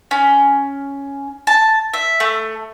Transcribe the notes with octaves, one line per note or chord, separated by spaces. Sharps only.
C#4
A5
E5
A3